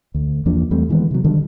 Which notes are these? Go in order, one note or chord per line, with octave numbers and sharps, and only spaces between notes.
D2
E2 F3 A#3 D4
E2 G3 A3 C4
D#3 E3 G#3 B3
C3 F#3
D3 D#3 G3